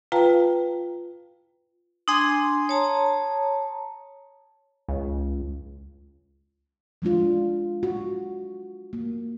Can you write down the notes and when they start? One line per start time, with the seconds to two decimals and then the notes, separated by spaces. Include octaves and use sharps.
0.12 F4 B4 F5 G5 A5 A#5
2.08 D4 G#5 C6 D#6
2.69 C#5 A5 A#5
4.89 C#2
7.02 F3 G#3 D4 F4
7.83 F#4
8.93 A#3